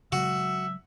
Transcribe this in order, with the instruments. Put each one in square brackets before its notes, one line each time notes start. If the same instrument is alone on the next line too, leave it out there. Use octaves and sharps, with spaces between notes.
[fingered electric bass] C#3 F#3 G#3 [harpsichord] F#4 [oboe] E5